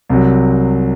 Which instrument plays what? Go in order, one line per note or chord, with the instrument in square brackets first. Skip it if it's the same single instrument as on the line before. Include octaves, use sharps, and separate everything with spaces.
[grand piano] C2 C3 F#3